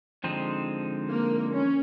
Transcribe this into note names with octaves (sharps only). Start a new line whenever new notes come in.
D3 F3 G#3 C4 D#4
A#3
C#4